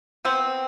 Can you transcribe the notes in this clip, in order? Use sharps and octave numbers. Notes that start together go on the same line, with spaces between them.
B3 C4